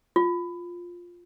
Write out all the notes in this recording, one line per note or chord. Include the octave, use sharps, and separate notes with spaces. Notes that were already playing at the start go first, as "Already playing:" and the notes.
F4